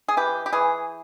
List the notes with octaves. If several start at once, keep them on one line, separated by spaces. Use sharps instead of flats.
G#4
E3 G4
G4
E3 G#4